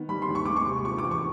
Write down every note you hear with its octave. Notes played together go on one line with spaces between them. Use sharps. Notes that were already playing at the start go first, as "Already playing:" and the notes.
Already playing: D#3 B3
G3 B5
C6
D#2
C#6
G#3 D6
C#6
C3
F3 C#6
D6
E2
C#6